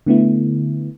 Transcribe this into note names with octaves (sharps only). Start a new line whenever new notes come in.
D3 A3 B3 E4